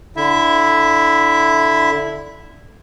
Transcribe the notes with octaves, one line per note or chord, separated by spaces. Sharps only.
D3 E4 E5